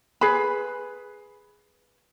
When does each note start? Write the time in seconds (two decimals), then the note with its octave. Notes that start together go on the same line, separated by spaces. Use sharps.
0.21 G#4 B4 B5